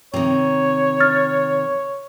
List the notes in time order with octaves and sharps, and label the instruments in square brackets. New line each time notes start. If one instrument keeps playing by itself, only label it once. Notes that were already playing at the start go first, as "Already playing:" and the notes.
[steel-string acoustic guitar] C3 D#3 [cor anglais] C#5
[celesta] F6 A6